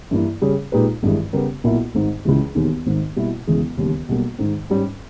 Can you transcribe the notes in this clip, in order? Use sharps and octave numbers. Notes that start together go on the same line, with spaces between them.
G2 E3 A#3 E4
C#3 G3 C#4 G#4
A#2 G#3 D#4 G4 B4
G#1 G2 E3 G#3
C#3 G3 B3 G4 A#4
B1 A#2 A#3 E4 A#4
G#1 G#2 D#3
C#2 C#3 E3 G#3
E1 D#2 D#3
G#1 G#2 D#3
B2 G3 A#3 E4
E1 E2 C#3 E3 G#3
E1 D#2 C#3 G3
B1 B2 G3 A#3
G#2 D#3 G#3
G#2 G3 C#4